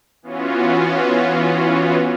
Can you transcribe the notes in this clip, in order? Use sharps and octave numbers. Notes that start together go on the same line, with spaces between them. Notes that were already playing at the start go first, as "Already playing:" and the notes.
E3 B3 C#4 F4 F#4